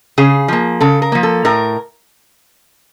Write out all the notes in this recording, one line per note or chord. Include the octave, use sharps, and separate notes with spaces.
C#3 G#4
F3 A#3
C#3 A4
A#4
F3 A#3
A4
A2 A#4